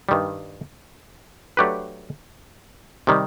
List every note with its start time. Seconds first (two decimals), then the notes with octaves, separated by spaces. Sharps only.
0.09 G2 D#3 G3
1.57 F#3 A3 D4 G4 B4
3.07 C3 D#3 G3